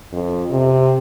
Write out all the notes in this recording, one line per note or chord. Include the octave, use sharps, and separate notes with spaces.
F2
C3